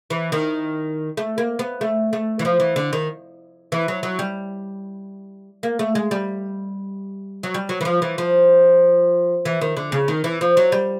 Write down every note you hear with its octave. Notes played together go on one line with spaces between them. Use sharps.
E3
D#3
A3
A#3
B3
A3
A3
E3
F3
E3
D3
D#3
E3
F#3
F#3
G3
A#3
A3
G#3
G3
F#3
G3
F#3
E3
F3
E3
F3
E3
D#3
D3
C#3
D#3
E3
F3
F#3
G3